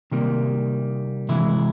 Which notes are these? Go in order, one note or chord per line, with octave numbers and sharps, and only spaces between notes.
C3 D#3 G3 A#3
C3 E3 G#3 E4